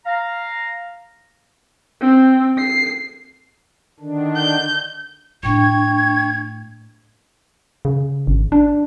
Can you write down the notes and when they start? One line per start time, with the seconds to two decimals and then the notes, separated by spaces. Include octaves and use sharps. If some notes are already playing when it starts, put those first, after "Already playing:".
0.05 F5 A#5
2.01 C4
2.58 C7
4.00 D3 D#3 D4
4.35 G6
5.43 A2 A3 D4 G5 C#6 G#6
7.85 C#3
8.27 G#1
8.52 D4